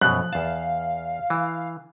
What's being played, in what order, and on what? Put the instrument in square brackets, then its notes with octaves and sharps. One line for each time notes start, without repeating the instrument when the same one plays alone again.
[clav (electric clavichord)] F#2 B2 [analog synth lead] F3 [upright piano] F#6
[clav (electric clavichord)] E2 A5 [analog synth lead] F5
[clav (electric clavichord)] E3